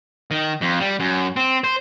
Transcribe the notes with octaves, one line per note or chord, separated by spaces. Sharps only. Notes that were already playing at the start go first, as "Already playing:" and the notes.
D#3
F2
G3
F#2
C4
C5